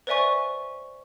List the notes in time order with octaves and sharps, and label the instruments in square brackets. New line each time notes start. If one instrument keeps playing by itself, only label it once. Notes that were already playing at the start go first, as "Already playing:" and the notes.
[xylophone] B4 C5 D5 E5 G#5 C#6